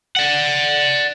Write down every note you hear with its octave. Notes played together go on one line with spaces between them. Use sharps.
D5 F#5